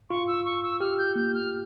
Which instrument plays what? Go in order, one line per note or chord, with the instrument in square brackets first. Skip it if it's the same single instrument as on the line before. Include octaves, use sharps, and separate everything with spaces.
[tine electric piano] F4 [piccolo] C#6
[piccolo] E6
C#6
E6
[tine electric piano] G4 [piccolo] F6
[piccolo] G6
[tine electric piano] A#3 [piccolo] G6
[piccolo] F6